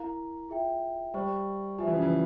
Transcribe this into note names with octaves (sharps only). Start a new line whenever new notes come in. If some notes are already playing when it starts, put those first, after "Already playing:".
Already playing: E4 A#4 F5 A#5
F4 G#4 E5 G5
G3 G4 C5 G5 C#6
F3 G4 C5 E5 G#5
E3
C#3
E3